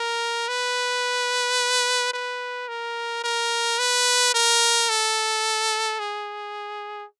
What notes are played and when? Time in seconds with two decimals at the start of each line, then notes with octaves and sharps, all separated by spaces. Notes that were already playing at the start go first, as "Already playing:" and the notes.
Already playing: A#4
0.48 B4
2.13 B4
2.68 A#4
3.24 A#4
3.79 B4
4.34 A#4
4.89 A4
5.99 G#4